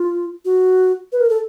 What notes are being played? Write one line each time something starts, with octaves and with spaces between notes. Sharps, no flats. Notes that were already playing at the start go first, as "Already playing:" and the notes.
Already playing: F4
F#4
B4
A#4
A4